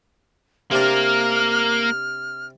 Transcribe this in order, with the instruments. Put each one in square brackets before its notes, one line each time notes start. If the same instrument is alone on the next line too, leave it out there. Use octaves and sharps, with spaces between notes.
[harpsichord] C3 D4 [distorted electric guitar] A#3 A#4 [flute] F6